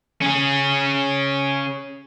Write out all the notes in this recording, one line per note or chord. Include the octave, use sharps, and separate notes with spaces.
C#4 G#4